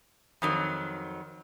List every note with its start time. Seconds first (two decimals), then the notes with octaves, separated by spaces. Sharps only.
0.42 F2 D#3 F#3